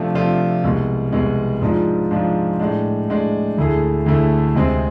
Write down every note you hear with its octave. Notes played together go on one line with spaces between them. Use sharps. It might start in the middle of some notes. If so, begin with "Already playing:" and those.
Already playing: C3 F3 A3 D4 F4
C3 F3 A3 D4 F4
C2 B2 G#3
C2 B2 G#3
G#2 F3 G#3 D4 F4
G#2 F3 G#3 D4 F4
A2 G#3 D4
A2 G#3 D4
D2 D3 A3 E4 G#4
D2 D3 A3 E4 G#4
D2 C3 G#3 C4 G#4